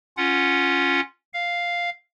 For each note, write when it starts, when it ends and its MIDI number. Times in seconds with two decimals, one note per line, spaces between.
0.17 1.00 61
0.17 1.00 65
0.17 1.00 78
1.33 1.90 77